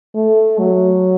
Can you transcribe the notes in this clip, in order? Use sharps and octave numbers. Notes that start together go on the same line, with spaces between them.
A3
F#3